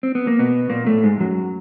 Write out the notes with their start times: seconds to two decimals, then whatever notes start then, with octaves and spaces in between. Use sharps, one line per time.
0.03 C4
0.15 B3
0.27 A#3
0.39 B2 B3
0.70 A#2 A#3
0.86 A2 A3
1.04 G#2 G#3
1.20 F#2 F#3